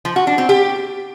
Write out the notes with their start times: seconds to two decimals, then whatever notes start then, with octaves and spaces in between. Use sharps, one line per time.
0.05 F3
0.16 F#4
0.27 D4
0.38 C4
0.49 G4